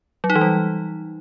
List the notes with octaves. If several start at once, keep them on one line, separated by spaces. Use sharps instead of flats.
F#3
D#4
E3
G3